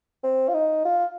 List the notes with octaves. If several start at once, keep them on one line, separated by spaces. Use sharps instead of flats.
C4
F4
D#4
F4